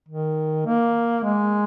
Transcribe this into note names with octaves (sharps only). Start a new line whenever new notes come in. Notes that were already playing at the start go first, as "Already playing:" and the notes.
D#3
A#3
G#3